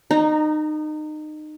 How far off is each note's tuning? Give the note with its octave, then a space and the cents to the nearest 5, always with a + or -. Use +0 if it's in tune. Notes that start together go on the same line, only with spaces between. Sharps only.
D#4 -25 A#5 +0